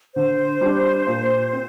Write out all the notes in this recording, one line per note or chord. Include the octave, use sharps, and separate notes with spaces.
D3 C5
G3 D4
A#2
C4